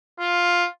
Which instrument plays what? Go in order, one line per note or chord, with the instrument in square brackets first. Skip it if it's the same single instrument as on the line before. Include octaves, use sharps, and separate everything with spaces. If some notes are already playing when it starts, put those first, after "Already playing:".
[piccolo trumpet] F4